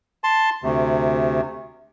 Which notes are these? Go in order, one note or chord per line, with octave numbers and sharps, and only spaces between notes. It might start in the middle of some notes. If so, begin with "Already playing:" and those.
A5 C6
D2 C3